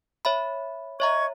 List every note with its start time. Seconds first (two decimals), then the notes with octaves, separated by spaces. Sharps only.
0.25 C#5 E5 B5
1.00 C#5 D#5 E5 A#5 C#6 G#6